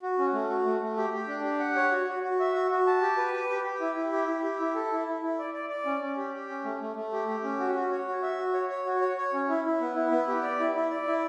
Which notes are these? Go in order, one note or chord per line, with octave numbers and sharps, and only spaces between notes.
F#4
C#4
A3
F#4
A3
A3
G4
G4
D4
G4
F#5
C#5
F#4
F#4
F#4
E5
F#4
F#4
A5
G4
B4
G4
G4
G4
E4
E4
G4
E4
G4
E4
A4
E4
E4
E4
D5
D5
D5
C#4
C#4
G4
G4
C#4
A3
A3
A3
G4
G4
C#4
F#4
F#4
C#5
F#4
E5
F#4
C#5
C#5
F#4
C#5
C#5
C#4
E4
E4
B3
E4
B3
G4
D5
E4
E4
D5
E4